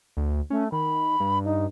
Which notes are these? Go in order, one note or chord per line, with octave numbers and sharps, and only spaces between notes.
D2
A3 C#4
D#3 B5
G2
D#4